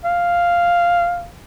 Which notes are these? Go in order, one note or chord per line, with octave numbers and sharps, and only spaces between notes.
F5